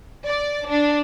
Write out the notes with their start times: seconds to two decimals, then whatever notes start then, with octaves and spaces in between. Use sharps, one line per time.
0.25 D5
0.67 D4